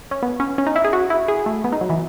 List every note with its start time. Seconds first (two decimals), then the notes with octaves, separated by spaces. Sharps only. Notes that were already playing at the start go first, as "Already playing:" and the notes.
0.11 C#4
0.23 B3
0.40 C#4
0.58 C#4
0.67 D#4
0.76 E4
0.84 G#4
0.93 F#4
1.10 E4
1.28 G#4
1.46 A3
1.64 B3
1.72 D#4
1.81 F#3
1.90 E3